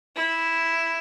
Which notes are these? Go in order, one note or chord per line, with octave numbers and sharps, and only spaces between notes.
E4